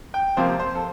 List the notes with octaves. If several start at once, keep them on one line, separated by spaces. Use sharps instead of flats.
G5
C3 F3 A#3 C5
C5
A4